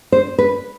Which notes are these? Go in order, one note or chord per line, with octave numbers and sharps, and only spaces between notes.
C5
B4